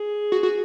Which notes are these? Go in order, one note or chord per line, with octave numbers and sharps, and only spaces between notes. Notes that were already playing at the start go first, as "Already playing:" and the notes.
Already playing: G#4
F#4
F#4